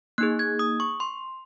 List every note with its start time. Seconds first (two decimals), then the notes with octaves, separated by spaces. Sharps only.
0.18 A#3 D#4 G#4 F#6
0.39 G#6
0.59 D#6
0.80 C#6
1.00 C6